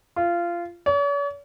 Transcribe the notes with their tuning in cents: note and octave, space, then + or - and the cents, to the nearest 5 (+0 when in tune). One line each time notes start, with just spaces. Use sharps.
F4 -20
C#5 +45